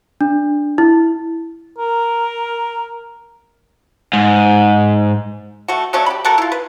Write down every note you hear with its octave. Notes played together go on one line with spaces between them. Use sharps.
D4
E4
A#4
G#2
A3 F#4
F#3 A3 C#4 D4
G4 B5
A3 F#4 A4 A#4
E4 F4
B4